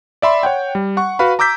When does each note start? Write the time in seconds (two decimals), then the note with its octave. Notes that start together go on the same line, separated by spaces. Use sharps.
0.22 D5 E5 B5 C6
0.43 C#5 F#5 G5
0.75 G3
0.97 F#5 C#6
1.19 F#4 B4 F5 B5
1.39 A#5 D6 E6 G6 B6